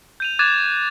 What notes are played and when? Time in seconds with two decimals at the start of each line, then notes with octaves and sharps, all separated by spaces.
0.20 G6 D#7 F7
0.39 D6 F#6 G#6 A6 D#7 E7